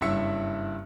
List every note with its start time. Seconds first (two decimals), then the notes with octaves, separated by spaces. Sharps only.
0.01 F#1 G2 E4 E5 E6 C#7